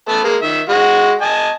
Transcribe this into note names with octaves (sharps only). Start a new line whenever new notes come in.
A3 B3 A5
G#3 A#3
D#3 E5
G#3 F#4
D#5 G#5 A5